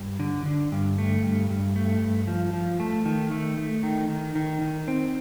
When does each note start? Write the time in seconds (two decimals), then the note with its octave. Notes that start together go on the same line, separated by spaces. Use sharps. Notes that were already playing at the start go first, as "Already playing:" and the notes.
Already playing: G2
0.20 D3
0.46 D3
0.72 G2
0.98 A3
1.24 G2
1.50 G2
1.76 A3
2.02 G2
2.27 F3
2.53 F3
2.80 A3
3.05 D#3
3.31 A3
3.58 A3
3.83 D#3
4.09 D#3
4.35 D#3
4.62 D#3
4.88 C4